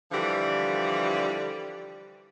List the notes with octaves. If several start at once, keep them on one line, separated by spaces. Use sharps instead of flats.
D3 E3 F3 G3